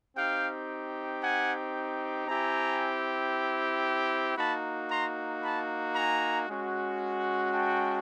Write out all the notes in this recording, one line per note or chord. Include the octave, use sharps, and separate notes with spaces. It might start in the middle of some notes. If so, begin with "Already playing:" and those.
C4 D#4 G4 F5 G5
F#5 G#5
C4 E4 G4 G#5 A#5
A#3 D#4 F#4 A5 B5
A#5 C6
A5 B5
G#5 A#5
G#3 C#4 F#4
G5 A5